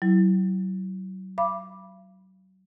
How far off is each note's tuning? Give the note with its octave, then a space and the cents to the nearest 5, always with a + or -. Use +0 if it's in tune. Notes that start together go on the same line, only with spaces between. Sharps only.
F#3 +30 E4 +0
F5 -45 B5 -15 D6 +0